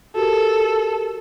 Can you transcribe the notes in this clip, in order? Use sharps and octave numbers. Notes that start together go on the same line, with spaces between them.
F#4 G4 A4 A#4